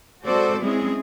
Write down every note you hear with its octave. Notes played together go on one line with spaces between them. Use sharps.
G#3 C4 F#4 A4 C5 D5
G#3 C4 C#4 E4 G#4